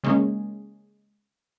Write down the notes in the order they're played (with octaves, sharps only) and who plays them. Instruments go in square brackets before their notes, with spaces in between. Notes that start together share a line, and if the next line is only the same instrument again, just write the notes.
[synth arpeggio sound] C#3 G#3 A#3 C#4